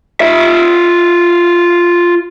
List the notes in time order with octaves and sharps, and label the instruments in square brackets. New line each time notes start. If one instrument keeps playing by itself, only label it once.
[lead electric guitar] F4 E5